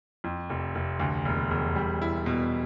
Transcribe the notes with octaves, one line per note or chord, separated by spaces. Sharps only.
F2
F1
F1
D2
E1
E1
G3
E4
B2